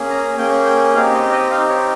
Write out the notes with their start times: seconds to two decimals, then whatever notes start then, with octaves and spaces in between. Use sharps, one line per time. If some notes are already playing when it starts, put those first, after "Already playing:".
Already playing: A#3 C#4 G#4
0.10 A#5
0.38 A#3 C#4 G#4 G5
0.66 G5
0.94 C4 D#4 G4 F5
1.14 D#5
1.32 D#5
1.51 C4 D#4 G4 F5
1.69 C#5